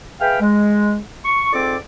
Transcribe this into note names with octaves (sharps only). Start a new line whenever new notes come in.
G#4 B4 E5 F5 G5
G#3
C#6
G#2 C4 F4 A4 D5 D6